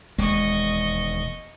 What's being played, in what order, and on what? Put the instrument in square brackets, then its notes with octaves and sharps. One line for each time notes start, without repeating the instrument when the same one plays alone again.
[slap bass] E1 D#2 G#3 [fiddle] D#5 C#6